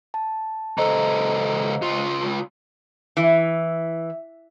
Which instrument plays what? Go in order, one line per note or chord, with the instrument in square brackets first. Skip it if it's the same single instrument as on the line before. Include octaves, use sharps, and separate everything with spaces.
[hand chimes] A5
[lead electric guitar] C#2 A4 [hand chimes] C5 D#5 A#5
[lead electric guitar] C#2 F4
[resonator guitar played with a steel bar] E3